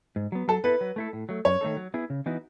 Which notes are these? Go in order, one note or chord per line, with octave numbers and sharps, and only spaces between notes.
G#2
F#3 B3
F#3 A4
B3 E4 A4 B4
F#3
A3 E4 A4
A2
F#3 A3
F#2 C#5
D#3 A3 D#4 A4
F#3
B3 E4 G#4
C#3
E3 B3 D#4 F#4